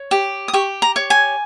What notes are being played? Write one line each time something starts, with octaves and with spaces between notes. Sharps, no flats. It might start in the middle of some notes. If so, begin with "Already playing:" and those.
Already playing: C#5
G4
D#6
G4 C#6
A#5
C#5
G#5